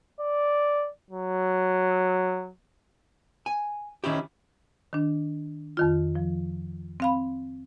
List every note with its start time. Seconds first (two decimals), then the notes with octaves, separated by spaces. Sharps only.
0.20 D5
1.11 F#3
3.46 G#5
4.04 D#3 C#4 E4 G4
4.93 D#3 D4
5.77 F2 D#3 F4
6.15 F3
7.00 C4 F5 B5